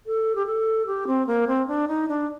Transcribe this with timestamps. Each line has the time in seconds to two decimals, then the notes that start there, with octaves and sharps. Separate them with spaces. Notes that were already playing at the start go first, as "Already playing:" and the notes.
0.06 A4
0.35 G4
0.46 A4
0.87 G4
1.07 C4
1.27 A#3
1.47 C4
1.68 D4
1.88 D#4
2.08 D4